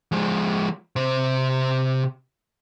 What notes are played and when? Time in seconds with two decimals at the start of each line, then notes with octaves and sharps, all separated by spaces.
0.12 F3 G#3
0.96 C3 C5